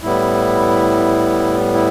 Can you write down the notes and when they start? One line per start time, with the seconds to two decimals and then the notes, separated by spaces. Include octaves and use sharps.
0.03 A2 G3 B3 E4
1.74 E4